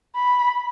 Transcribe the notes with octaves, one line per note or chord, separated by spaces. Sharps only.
B5